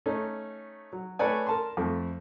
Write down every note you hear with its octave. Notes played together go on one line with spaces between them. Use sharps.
A3 C#4 D#4
F#3
A3 A4 B4 C#5 D5 G#5
A#4 A5 C6
F2 A3